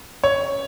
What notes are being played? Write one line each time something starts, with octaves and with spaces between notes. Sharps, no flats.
C#5